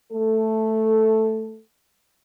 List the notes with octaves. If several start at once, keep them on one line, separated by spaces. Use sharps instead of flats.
A3 A4